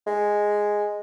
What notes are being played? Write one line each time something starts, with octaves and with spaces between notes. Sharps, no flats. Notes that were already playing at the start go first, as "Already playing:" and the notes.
G#3